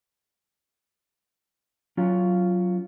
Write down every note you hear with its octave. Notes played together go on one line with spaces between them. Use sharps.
F#3 C#4 F4